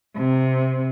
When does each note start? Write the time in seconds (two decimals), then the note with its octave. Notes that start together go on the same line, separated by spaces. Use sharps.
0.16 C3